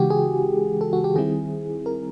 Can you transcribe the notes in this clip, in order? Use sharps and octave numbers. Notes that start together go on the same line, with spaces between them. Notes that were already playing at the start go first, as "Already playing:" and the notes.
Already playing: C#3 E3 G#3 F#4 G4
G#4
A4
F#4
G4
D#3 G3 C4 E4 G#4
A#4